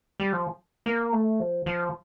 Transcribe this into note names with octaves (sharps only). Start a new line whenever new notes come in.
G3
F3
A#3
A3
F3
F3